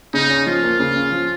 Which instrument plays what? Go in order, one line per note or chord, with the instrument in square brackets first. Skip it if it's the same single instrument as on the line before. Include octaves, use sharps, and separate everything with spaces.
[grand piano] C#3 [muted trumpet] D#4
[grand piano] C#4
[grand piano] F3 [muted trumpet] F4
[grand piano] A#3
C#3
C#4
F3